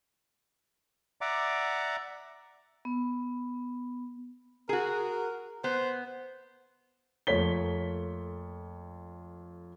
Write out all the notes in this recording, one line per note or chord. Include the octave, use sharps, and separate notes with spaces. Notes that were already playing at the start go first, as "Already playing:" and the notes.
D5 E5 F#5 A#5 D6
B3
F#4 G#4 A#4
B3 C5
F2 A3 A#3 C#5 B6 G7